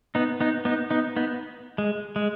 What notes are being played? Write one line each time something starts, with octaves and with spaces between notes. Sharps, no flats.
B3 D#4
B3 D#4
B3 D#4
B3 D#4
B3 D#4
G#3
G#3